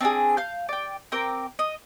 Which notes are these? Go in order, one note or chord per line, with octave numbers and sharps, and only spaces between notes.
C4 D4 E4 G#4
F5 G6
D5 G5
C4 A#4 G5 D6
D#5